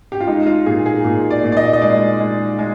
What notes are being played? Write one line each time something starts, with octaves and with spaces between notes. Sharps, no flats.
G4
F4
G#3 D#4
F4
A#2 G#4
G#4
A#2
D5
A#2
D5
D#5
D#5
G#3 D5
G#3
G#3